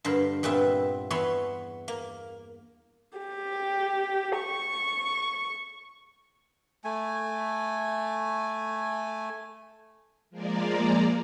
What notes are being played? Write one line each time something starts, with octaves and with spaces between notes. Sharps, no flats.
G2 D3 A#4 C5 B5
G2 A#2 B3 C4 E5
E2 B3 C#5 E5 B5 C6
A#3
G4
C#6
A3 G#5
F3 G#3 A#3 A#4 D5